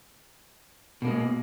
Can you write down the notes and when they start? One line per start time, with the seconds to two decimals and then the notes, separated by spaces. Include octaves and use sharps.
1.02 B2
1.05 A#3
1.07 G#3